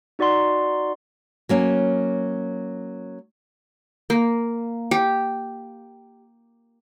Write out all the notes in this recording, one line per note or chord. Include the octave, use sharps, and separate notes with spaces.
D#4 F#4 D5 F#5 C6
F#3 A#3 C#4
A#3
G4